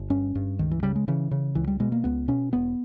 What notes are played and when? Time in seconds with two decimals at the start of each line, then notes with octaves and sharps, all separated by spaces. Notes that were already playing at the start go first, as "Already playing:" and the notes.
Already playing: G1
0.10 G2 C#4
0.35 G2
0.59 C#2 D#3
0.71 E3
0.83 C#3 G3
0.96 G#3
1.08 C#3 E3
1.31 C#3
1.55 C#2 E3
1.67 G3
1.80 B2 G#3
1.92 A#3
2.04 C#2 B3
2.28 B2 C#4
2.53 E1 B3